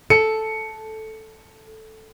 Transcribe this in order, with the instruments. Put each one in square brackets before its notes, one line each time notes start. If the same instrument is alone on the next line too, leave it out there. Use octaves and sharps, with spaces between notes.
[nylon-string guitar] A4 [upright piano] C#7